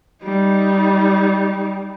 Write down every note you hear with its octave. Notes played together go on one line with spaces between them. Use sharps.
G3 D#4